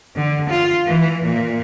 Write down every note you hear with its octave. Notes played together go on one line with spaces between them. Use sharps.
D3
F4
E3
A#2